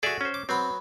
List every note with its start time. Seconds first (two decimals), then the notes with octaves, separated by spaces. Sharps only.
0.03 F#4 G#4 A4 D5 E5
0.21 C#4 C5
0.34 D6
0.49 F#3 B3 C4 B5